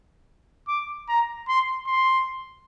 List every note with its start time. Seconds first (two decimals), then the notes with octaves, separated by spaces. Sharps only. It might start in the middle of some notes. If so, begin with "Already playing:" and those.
0.68 D6
1.08 A#5
1.48 C6
1.87 C6